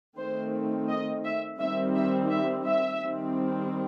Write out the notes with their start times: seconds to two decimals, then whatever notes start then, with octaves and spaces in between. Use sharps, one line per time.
0.17 D#3 A3 C4 C5
0.88 D#5
1.24 E5
1.59 D#3 G3 C4 E5
1.96 E5
2.30 E5
2.66 E5
3.02 D#3 G3 C4